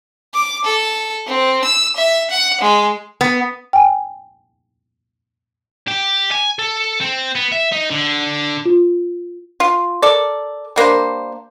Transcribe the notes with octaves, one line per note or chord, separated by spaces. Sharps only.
D6
A4
C4
E6
E5
F#5
G#3
B3
G5 G#5
G4
G#5
A4
C4
B3
E5
D#4
D3
F4
F4
A4 A#4 D5
G3 A#3 D4 C5